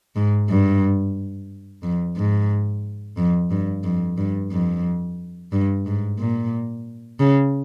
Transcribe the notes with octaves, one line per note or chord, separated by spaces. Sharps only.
G#2
G2
F2
G#2
F2
G2
F2
G2
F2
G2
G#2
A#2
C#3